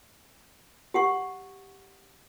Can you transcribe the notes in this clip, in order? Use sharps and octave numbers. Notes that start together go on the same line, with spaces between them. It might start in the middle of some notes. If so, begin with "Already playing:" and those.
G4 F#5 C#6